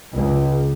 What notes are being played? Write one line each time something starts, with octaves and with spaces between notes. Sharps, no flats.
C#2